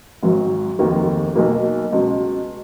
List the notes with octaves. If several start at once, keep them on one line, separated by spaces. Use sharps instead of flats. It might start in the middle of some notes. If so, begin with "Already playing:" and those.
G#1 G#2 F#3
F1 D#2 D#3 A#3
B1 B2 A#3
C#2 B2 G#3